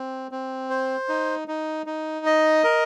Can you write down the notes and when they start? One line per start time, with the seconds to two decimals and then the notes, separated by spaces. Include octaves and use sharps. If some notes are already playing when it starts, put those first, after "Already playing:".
Already playing: C4
0.31 C4
0.70 C5
1.08 D#4
1.48 D#4
1.86 D#4
2.26 D#5
2.64 A#4